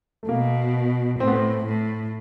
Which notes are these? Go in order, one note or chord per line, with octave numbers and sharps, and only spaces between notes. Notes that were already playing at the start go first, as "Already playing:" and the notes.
A3
B2 A#3
A2 C4
B3
C4
A2